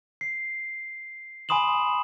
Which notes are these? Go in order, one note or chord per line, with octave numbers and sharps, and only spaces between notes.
C7
G#5 B5 C6 D#6 E7 F#7